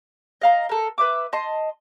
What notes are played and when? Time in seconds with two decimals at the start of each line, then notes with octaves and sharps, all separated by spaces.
0.42 D#5 F5 A#5
0.69 A4 A#4
0.98 B4 E5 D6
1.33 D#5 A5 C6